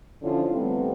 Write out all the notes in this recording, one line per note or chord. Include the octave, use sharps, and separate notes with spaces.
D3 F3 C#4 E4 F4
C3 G3 A3 B3 C4